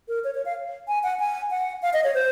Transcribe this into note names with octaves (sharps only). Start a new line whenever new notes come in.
A#4
C#5
C#5
F5
G#5
F#5
G#5
F#5
F5
D#5
C#5
C5